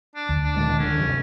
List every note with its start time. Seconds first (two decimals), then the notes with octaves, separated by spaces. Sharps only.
0.16 D4
0.29 D2
0.44 D4
0.56 A#2 D#3 G#3
0.80 D3 D#3 C#4 D4
0.98 G2 C3 F#3